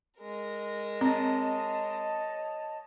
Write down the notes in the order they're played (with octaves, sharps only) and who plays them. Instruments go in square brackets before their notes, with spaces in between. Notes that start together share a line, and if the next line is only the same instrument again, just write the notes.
[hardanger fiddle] G#3 A#4
[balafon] C4 [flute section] C#5 D#5 A5